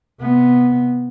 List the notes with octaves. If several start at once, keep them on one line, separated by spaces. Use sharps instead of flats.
C3 B3